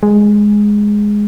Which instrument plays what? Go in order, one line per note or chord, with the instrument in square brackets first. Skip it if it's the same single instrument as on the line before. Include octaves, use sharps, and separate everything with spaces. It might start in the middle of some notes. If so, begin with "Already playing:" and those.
[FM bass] G#3